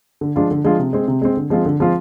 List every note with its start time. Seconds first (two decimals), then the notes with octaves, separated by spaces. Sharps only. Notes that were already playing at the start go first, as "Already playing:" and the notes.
0.21 D3
0.36 F3 G#3 D4 F4
0.51 D3
0.64 F3 G#3 D4 F4
0.79 C3
0.93 G#3 C4
1.08 C3
1.22 G#3 C4
1.37 D3
1.50 F3 G#3 C4 F4
1.66 D3
1.80 F3 G#3 C4 F4